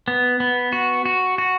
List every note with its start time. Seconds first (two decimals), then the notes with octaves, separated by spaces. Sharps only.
0.08 B3
0.40 B3
0.73 F#4
1.05 F#4
1.38 F#4